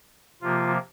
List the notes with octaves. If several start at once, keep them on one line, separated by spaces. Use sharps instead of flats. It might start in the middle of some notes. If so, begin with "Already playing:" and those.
C3 F3 A#3 F4